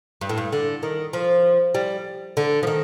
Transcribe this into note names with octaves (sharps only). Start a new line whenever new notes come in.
G2
A2
G2
D3
D#3
F3
G3
D3
F3
D#3